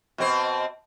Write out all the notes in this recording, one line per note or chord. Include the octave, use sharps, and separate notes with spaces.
B2 C4 C5